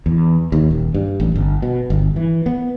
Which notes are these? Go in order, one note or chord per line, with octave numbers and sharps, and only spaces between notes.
E2
D#2
D#1
G2
A1
G1
B2
G1
E3
B3